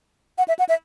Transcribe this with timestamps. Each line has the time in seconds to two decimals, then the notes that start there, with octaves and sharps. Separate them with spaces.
0.38 F#5
0.48 E5
0.59 F#5
0.69 E5